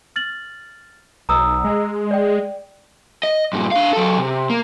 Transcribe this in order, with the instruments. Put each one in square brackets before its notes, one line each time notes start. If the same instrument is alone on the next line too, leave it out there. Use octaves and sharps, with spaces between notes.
[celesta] F6 A6 F#7
[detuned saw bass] B1 [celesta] A#5 D#6 E6
[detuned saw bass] G#3
[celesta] D5 G5
[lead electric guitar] D#5
G2 A#2
D4 F5
F#3 A4
C3
A#3